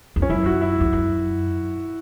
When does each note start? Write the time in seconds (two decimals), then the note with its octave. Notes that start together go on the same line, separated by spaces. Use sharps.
0.16 E2
0.22 C#4
0.30 F#2 E4
0.46 F#4
0.61 E4
0.80 E2
0.93 F#2